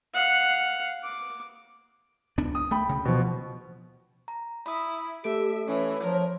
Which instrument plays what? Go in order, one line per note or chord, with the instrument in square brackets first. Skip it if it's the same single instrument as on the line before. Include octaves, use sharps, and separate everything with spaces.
[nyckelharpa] F5 F#5
D6
[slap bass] C#2 B3 D4
[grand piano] D#6
[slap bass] A3 [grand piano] G5 B5
[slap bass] D2 C#3
[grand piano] B2 F3
[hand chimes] A#5
[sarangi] E4 [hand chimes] B5 D#6
[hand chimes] A3 A4 D7 [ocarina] G4 [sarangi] E5
[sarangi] E3 [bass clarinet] C#4 [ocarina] C#5
[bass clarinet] F3 [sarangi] A#4